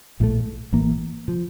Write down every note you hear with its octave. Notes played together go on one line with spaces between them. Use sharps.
A#1 A2 E3 A3
A1 A2 E3 A#3
D3 F3